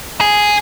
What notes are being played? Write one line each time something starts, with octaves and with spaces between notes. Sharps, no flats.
G#4